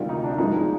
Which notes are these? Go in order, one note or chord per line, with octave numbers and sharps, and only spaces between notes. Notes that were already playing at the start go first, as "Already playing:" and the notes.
Already playing: D2 C3 D#3 G3 F4
D#4
D4
G2 F3 G#3 D#4